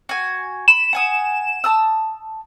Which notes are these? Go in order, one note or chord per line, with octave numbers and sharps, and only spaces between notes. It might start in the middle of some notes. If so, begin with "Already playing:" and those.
F#4 G#5
B5 E7
F#5 G#5 D#6
A5 D#6 E6